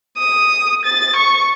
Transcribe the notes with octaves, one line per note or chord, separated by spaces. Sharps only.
D#6
A6
C#6